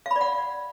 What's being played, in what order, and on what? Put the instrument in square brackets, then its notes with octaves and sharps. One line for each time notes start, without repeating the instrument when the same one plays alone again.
[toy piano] F5
B5
D5
F#5